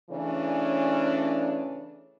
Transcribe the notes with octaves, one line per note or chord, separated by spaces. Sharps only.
C#3 E3 A3 C#4 D4